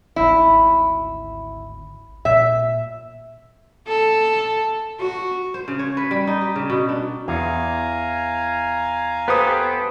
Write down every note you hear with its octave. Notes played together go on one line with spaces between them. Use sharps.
G#1 D2 E4
A#2 E5
A4
F#4
C5
C#3
C#5
B4
G3
D#4
G4
C#3
B2
D4
E2 F5 G#5 A#5
B3 G4 A4 B4 C5 D#6